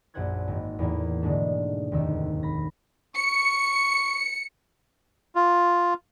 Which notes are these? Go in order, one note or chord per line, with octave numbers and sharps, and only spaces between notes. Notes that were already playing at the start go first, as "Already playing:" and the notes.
A#1 F#2 C5 F#5 G6 G#6
G#1
E2 A2 A#3
G#2 B2 D3 G#3 A3 D4
F1 D#2 D#3 C4 E6
B5 A#6
C#6 C#7
F4